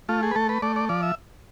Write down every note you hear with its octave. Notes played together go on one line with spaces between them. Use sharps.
A3 F4
G#4
B4
A3 A4
B4
A3 D5
D5
F3 D5
E5